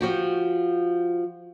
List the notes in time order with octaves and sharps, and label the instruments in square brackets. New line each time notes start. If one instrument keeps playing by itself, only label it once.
[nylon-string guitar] F3 F#4 G4